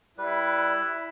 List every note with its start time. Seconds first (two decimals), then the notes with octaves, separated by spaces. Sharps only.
0.18 G3 E4 B4